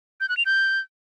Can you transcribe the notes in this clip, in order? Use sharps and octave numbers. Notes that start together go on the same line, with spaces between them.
G6
F#6
F7
G6